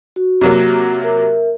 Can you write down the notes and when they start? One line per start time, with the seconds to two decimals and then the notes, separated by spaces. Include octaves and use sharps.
0.16 F#4
0.41 C3 F#3 A#3
1.02 A#4 E5